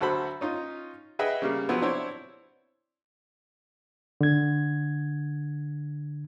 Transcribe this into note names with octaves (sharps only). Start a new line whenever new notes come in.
D2 F#3 F#4 A4 C5 B5
C#4 D#4 F4
G#4 B4 D#5 E5 F#5 G5
C#3 G3 A#3
C3 F3 F#3 B3 C4 E4
C4 D4 E4 C5 C#5
D3 G#6